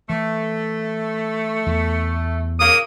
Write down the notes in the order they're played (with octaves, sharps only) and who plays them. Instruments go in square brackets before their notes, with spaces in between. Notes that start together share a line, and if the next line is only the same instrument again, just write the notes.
[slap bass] E3 [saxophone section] A3
[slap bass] E2
[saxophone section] A#2 C#3 A#3 [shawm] D#6